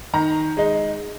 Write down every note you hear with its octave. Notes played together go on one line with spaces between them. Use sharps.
D#3 A#5
G#3 D#4